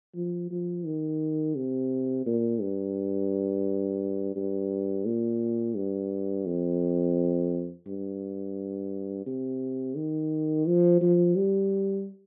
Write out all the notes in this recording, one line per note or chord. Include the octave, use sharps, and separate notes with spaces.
F3
F3
D#3
C3
A#2
G2
G2
A#2
G2
F2
G2
C3
D#3
F3
F3
G3